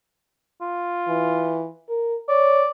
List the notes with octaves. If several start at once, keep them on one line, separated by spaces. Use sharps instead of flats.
F4
E3
A#4
C#5 D5